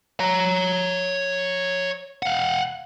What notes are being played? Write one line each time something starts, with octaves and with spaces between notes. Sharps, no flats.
C#5 A#5
F5 F#5